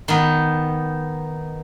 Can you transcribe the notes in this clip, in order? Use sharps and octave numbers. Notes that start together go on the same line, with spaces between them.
D#3 B3